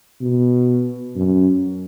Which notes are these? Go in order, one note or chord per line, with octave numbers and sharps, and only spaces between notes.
B2
F#2